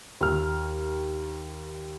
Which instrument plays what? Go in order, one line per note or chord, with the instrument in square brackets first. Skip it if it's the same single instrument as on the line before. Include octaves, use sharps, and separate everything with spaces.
[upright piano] D#2 F6